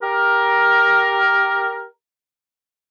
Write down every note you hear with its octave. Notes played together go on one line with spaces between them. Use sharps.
G4 A#4